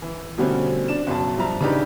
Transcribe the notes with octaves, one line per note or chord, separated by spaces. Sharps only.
E3
B2 D3 G3 A3 C4 C#4
D4 E7
F#1 B2 A5
G2 F3 E5 A5 A#5
C#3 E3 D4 D#4 G4 B4